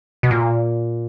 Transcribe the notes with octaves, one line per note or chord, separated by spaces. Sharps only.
B2
A#2